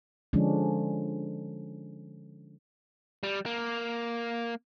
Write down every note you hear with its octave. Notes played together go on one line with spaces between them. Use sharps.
D3 F3 G#3 C#4 D4
G3
A#3